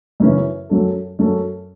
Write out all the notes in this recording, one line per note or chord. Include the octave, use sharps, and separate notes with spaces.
F#2 C#3 E3 C#4 E4
F#2 F#3 C#4 A4
F#2 F#3 C#4 A4